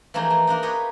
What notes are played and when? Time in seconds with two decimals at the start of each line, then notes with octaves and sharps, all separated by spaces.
0.14 E3 F3 A3 A#3 D#4 G#4
0.30 A3
0.47 A#3 D4 D#4
0.63 G4 G#4 B4 C#5 D#5